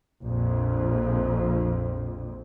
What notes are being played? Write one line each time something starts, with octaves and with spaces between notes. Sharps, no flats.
A#1 F2